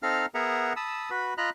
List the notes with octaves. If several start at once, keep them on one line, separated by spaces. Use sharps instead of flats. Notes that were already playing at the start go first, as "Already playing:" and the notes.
C4 D#4 A4 F5 A#5 F6
B3 G#4 A#4 E5 F#5 A#5
A5 B5 D#6 E6
F#4 B4 B5
F4 D#5 A#5 B5 F#6